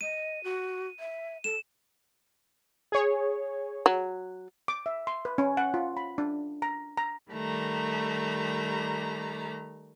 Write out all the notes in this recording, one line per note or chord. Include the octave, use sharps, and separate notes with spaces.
D#5 D#7
F#4
E5
A4 E7
G#4 C#5
F#3
D6
E5
C6
B4
C#4
F#5
F4
B5
D4
A#5
A#5
D#3 G3 A3 A#5